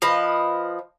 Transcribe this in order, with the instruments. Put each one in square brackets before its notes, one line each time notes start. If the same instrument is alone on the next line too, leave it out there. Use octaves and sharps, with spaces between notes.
[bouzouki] F3 B4 D#5